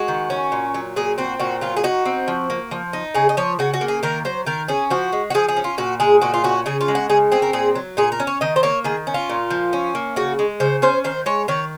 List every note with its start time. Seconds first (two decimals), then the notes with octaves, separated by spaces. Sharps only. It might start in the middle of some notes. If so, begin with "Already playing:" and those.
Already playing: G#3 F#4
0.08 D#3
0.30 C#4
0.52 A#2
0.74 F#3
0.96 A#2 G#4
1.18 C4 F#4
1.40 A#2 F#4
1.61 F#3 F4
1.77 G#4
1.83 D#4 F#4
2.05 C4
2.28 F3
2.50 A#3
2.71 F3
2.93 D#4
3.14 C#3 G#4
3.29 D#5
3.37 F3 C#5
3.59 C#3 F#4
3.74 F#4
3.81 A#3
3.88 G#4
4.03 D#3 A#4
4.25 F#3 C5
4.46 D#3 A#4
4.68 C#4 G#4
4.90 F3 F#4
5.13 G#3
5.30 F#4
5.34 F3 G#4
5.48 G#4
5.56 C#4
5.64 F4
5.78 A#2 F#4
6.00 G#3 G#4
6.21 A#2 F#4
6.34 F4
6.44 C#4 F#4
6.66 C#3 G#4
6.81 F4
6.88 G#3
6.95 F#4
7.10 C#3 G#4
7.32 C4 G#4
7.42 A#4
7.53 A#2 G#4
7.75 F#3
7.97 A#2 G#4
8.12 A#4
8.20 C#4
8.27 C#5
8.41 D#3 D#5
8.56 C5
8.63 A#3 C#5
8.84 D#3 G#4
9.07 C#4
9.14 F4
9.30 A#2
9.50 F3
9.73 C#4
9.95 A#3
10.16 C#3 F#4
10.39 G#3
10.60 C#3 C5
10.82 C#4 C5
11.04 D#3 C5
11.26 G#3 C#5
11.48 D#3 C#5